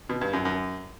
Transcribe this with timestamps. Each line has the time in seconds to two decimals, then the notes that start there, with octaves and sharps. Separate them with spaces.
0.09 B2
0.21 G2
0.33 F#2
0.45 F#2